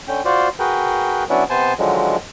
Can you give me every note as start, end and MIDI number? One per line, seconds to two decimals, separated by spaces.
0.08 0.21 50
0.08 0.21 61
0.08 0.21 79
0.25 0.48 65
0.25 0.48 66
0.25 0.48 72
0.25 0.48 74
0.59 1.24 66
0.59 1.24 68
0.59 1.24 70
0.59 1.24 71
0.59 1.24 79
1.30 1.44 54
1.30 1.44 59
1.30 1.44 61
1.30 1.44 62
1.30 1.44 64
1.50 1.73 48
1.50 1.73 59
1.50 1.73 72
1.50 1.73 80
1.50 1.73 81
1.79 2.17 50
1.79 2.17 51
1.79 2.17 53
1.79 2.17 54
1.79 2.17 56